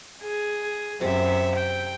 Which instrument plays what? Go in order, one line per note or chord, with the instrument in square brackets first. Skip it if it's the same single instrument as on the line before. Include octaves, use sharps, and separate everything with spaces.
[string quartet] G#4
[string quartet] F#2 E5 [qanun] C3
[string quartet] G5